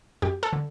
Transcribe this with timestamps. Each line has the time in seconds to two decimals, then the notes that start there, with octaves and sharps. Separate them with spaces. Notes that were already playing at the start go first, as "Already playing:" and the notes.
0.22 F#2 G4
0.43 A4
0.53 D3